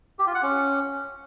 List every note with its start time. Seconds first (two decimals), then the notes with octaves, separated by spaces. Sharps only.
0.19 G4
0.27 F4
0.35 F#5
0.43 C#4